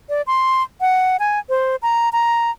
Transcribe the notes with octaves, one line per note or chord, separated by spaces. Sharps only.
D5
C6
F#5
G#5
C5
A#5
A#5